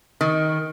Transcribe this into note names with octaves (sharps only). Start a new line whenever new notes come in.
D#3